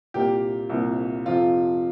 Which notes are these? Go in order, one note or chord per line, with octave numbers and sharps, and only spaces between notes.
C2 A#2 A#3 G4
C2 A#2 A#3
F2 C3 F3 F4